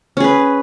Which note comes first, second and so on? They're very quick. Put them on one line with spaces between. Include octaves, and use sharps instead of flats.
C#4 G#4 B4